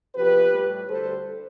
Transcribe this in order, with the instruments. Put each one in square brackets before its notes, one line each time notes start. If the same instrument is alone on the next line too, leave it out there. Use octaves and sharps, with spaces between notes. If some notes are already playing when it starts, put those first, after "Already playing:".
[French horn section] E2 C3 F3 G4 B4
A2 G3
D2 D3 G3 A4 C5